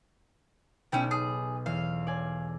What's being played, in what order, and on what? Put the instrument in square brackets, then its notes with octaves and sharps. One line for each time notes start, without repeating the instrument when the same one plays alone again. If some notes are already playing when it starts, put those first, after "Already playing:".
[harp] B1 [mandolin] C#4 E4 G5
[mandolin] G#4
[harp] E2 [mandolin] F5
[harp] D5 G#5